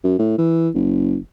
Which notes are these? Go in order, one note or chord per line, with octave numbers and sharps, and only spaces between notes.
F#2
A2
E3
F#1